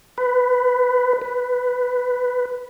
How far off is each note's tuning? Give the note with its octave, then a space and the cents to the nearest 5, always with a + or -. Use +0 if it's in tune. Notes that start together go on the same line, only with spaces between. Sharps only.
B4 +15
B4 +10